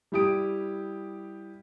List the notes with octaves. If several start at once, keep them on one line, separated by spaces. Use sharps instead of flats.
G3 E4 G4 D#6 D7